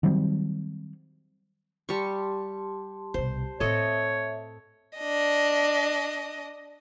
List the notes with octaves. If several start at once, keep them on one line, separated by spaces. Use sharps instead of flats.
D#3 F#3 G3 C4
G3 G4 A5 C6 C#6
C2 B2 C5
A2 C4 A4 C#5 D#5 E5
D4 D#5